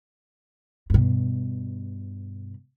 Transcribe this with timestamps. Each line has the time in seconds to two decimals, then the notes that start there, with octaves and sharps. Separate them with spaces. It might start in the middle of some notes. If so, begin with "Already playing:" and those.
0.90 G2 B2